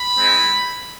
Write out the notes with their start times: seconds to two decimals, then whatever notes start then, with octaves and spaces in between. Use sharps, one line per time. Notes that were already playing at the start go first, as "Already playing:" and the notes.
Already playing: B5
0.16 G#3 C4 E4